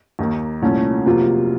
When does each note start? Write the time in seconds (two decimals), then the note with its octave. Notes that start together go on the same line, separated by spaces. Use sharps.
0.19 D#2 D#3 A#3
0.62 C2 A#2 A3 C#4
1.06 F2 C3 F#3 A#3 F4